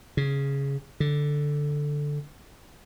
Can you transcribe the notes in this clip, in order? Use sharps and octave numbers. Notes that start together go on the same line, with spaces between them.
C#3
D3